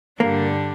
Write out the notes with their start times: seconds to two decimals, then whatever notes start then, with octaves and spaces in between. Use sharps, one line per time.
0.20 G2 D3 G3 A#3 D4 A4